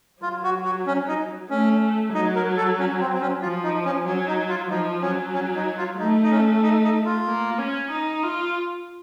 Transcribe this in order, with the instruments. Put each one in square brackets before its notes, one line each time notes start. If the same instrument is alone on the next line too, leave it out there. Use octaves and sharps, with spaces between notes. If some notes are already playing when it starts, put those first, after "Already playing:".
[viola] F#3 [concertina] F4
[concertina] F#4
F#4
C#4
D#4
[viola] A3 [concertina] C#4
[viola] F#3 [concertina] D#4
[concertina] A#4
A4
C#4
C4
C4
C#4
[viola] F3 [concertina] F4
[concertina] D#4
C#4
[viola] F#3 [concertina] C#4
[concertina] D#4
F4
[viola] F3 [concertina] D#4
[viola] F#3 [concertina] C#4
[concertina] C#4
D#4
F4
[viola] A3 [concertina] D#4
[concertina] D#4
C#4
D#4
D#4
F4
[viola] A#3
C#4
D#4
F4